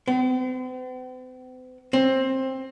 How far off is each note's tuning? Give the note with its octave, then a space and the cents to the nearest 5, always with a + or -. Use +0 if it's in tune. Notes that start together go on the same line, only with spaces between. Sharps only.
C4 -45
C4 +15